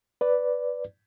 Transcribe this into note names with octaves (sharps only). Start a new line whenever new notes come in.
B4 D5